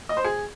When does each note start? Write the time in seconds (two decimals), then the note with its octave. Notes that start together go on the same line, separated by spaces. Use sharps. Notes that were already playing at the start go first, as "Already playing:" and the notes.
0.09 D#5
0.17 C5
0.24 G#4